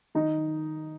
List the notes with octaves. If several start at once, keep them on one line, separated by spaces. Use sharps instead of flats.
D#3 D#4